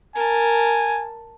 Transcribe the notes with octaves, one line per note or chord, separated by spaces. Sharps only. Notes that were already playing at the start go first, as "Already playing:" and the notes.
A#4 G#5 A5